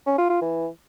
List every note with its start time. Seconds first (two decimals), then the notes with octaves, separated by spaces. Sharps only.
0.06 C#4
0.18 F4
0.30 F4
0.41 E3